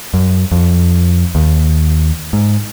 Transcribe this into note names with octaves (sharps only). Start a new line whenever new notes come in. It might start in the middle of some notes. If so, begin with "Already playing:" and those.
F#2
F2
D#2
G#2